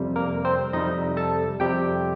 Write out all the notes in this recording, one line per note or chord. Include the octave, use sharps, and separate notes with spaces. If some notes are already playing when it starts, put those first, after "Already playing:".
Already playing: F2 C3 G3
A#3 A#4
C4 C5
F2 C3 G3 D#4 D#5
A4 A5
F2 C3 G3 G4 G5